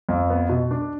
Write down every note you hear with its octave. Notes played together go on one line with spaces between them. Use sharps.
F2
B3
B2
D4